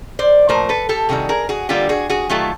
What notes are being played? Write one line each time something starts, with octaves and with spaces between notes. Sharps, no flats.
C5 D5
A#2 F3 A3 A#4 C5
A4 B4
G4 A4
C3 D#3 G3 F#4 G#4
G#4 A#4
F#4 G#4
D3 G3 A#3 F4 G4
F#4 G#4
F#4 G#4
D#3 F#3 A3 F4 G4